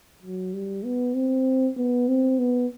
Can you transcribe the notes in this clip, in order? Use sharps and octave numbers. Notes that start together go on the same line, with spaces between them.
F#3
G3
B3
C4
B3
C4
B3